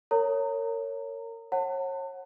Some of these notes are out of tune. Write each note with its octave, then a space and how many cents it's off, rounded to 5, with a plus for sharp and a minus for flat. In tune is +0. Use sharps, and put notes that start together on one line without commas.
A#4 -30 C#5 +0 A#5 -25
C#5 -35 F#5 +0 A5 +35